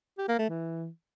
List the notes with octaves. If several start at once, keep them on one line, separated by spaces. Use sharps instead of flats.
G4
A#3
A3
E3